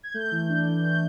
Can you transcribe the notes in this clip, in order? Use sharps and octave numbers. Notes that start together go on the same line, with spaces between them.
G#6
A3 G6
E3
D4
E3
A3 G6